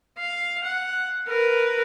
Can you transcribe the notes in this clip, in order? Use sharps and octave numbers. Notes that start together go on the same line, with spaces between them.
F5
F#5
A#4 B4